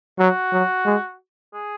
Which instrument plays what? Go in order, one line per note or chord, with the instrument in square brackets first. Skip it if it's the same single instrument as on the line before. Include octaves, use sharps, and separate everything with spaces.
[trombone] F#3 [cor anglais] F#4
[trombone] F#3
G#3
[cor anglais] G#4